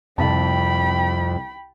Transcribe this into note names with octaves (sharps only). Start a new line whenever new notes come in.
C2 F2 G5 A5 B5